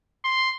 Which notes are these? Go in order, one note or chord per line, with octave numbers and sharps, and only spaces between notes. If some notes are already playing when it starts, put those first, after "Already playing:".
C6